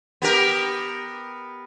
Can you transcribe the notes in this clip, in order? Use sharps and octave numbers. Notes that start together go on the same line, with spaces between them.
B3 G4 A#4